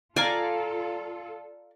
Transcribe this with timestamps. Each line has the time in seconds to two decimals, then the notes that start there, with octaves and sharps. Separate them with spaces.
0.16 F4 A4 D5 F5 G#5 A#5